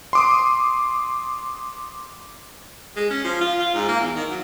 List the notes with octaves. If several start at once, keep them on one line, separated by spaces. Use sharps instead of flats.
C6 D6 D#6
G#3
C#4
F3
F4
F4
G#2
A#3
E2
D#3
F#3